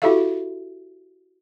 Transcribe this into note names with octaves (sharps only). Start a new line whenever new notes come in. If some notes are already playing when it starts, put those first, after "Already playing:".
E4 F#4 G4 A4 E5 F5